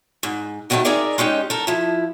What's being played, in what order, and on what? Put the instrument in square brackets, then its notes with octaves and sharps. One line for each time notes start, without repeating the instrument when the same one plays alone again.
[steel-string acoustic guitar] G#2
B2 D3 D#3 F#3 A3
D#4 G#4 A#4 D5 E5
G#3 C#4 D#4 G4
A4 A#4
F3 E4